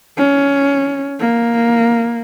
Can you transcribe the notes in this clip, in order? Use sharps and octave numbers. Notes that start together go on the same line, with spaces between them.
C#4
A#3